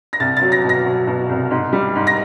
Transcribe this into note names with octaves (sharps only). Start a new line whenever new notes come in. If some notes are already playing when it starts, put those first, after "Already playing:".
A#6
C2 A6
F#3 A6
A#6
B2
A#6
F#3
B2
C2
G#2
G3
G#2
A#6